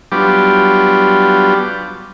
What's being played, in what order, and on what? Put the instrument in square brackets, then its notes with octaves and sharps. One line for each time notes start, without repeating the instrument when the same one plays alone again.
[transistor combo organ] F#3 G3 B3 D4 F4 G4